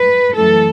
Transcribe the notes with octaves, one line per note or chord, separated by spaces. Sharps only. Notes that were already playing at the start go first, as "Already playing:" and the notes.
Already playing: B4
F#2 E3 A3 A4